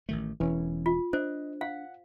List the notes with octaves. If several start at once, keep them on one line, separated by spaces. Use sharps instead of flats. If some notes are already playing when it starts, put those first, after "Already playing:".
A1 D#3 A3
E1 E3 C#4
F4
D4 C5 D#5
F5 F#5